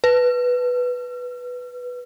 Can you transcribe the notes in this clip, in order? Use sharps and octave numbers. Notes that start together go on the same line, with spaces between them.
B4